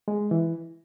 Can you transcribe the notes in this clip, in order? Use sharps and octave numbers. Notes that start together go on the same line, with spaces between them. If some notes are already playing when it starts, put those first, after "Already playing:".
G#3
E3